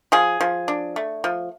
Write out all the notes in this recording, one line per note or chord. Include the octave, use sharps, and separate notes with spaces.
F3 G#4
F3
D4
A3
F3